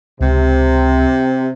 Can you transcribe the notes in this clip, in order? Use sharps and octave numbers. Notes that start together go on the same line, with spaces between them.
C#2 C3